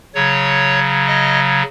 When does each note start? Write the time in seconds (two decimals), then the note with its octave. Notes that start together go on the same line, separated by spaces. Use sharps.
0.15 C#3 F#3 C#5
1.08 D#5